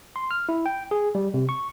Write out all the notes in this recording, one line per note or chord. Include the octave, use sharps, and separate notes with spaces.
C6
F6
E4
G5
G#4
G3
C3
C#6